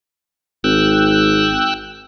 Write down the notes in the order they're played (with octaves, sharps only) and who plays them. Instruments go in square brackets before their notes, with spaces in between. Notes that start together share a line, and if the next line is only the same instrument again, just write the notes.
[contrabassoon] G#1 [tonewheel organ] G5 E6 F#6